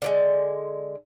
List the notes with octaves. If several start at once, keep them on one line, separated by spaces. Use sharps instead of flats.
D3 F3 G#3